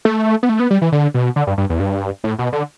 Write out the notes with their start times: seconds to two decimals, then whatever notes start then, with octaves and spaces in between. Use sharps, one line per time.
0.05 A3
0.43 B3
0.49 A3
0.60 B3
0.70 G3
0.81 E3
0.92 D3
1.14 B2
1.36 D3
1.47 G2
1.58 G2
1.70 E2
1.80 G2
2.24 A2
2.39 B2
2.53 D3